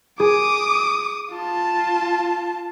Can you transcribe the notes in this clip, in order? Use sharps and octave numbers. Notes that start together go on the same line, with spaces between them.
G#4 D6 D#6
F4 A5